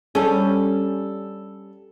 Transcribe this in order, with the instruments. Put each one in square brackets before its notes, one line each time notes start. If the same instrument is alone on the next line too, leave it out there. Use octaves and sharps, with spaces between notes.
[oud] G3 C#4 [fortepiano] A4